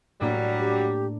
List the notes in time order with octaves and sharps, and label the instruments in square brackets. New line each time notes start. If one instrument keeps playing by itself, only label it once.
[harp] A2 A#3 D4 [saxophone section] F#3 G3
[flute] G4